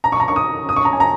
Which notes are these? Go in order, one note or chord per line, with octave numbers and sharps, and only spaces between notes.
A#5
C#6
A#5
C#6
D#6
D#6
C#6
A#5
G#5
A#5